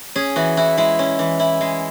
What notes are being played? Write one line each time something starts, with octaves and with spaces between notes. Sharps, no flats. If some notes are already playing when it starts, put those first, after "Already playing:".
C#4 G#4
E3 F#4
E4 F#4
G#3 E4
C#4
E3
E4
G#3